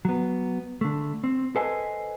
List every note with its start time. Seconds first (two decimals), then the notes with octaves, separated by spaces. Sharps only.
0.05 F#3 B3
0.81 D3 A3
1.24 C4
1.56 A4 B4 C5 D#5 G#5